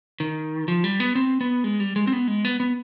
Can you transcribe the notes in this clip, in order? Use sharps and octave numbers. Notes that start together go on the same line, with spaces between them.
D#3
F3
G3
B3
C4
B3
G#3
G3
G#3
C4
B3
G#3
B3
B3